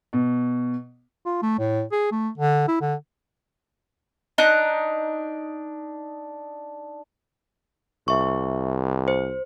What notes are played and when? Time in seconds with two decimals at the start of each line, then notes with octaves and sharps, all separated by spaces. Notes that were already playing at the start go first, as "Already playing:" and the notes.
0.13 B2
1.26 F4
1.42 A3
1.59 A2
1.92 G#4
2.12 A3
2.38 D3
2.68 E4
2.81 D3
4.38 D4 D#4 A#5 F#6
8.08 C2 E5 C#6
9.08 C5